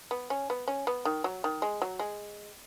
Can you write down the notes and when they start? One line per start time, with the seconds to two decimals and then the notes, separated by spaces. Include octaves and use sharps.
0.11 B3
0.30 C#4
0.50 B3
0.68 C#4
0.87 B3
1.05 D#3
1.24 F#3
1.44 D#3
1.62 G#3
1.82 F#3
1.99 G#3